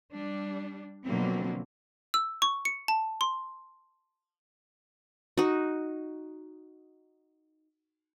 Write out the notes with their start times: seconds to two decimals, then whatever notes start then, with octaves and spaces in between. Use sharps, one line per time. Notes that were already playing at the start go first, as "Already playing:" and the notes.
0.13 G3 D4
1.06 B2 D3 F3 F#3 A#3 C4
2.14 E6
2.42 C#6
2.65 C#7
2.88 A5
3.21 C6
5.37 D#4 F#4